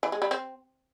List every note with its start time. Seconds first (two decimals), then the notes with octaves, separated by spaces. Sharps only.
0.03 E3
0.12 G#3
0.22 G3
0.31 C4